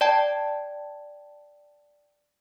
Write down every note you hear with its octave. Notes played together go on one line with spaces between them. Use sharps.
D5 G5 A5 G#6